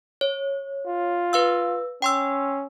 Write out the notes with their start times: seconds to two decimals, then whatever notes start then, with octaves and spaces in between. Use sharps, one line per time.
0.21 C#5
0.86 F4
1.33 B4 F5 E6
2.02 C#4 G5 C6 E6